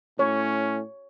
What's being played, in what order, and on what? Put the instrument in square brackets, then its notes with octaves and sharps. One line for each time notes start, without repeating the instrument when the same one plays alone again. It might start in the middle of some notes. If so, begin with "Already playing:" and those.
[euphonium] A2 [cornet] C#4 [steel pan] C#5